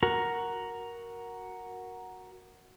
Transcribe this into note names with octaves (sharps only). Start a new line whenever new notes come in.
F#4 A#4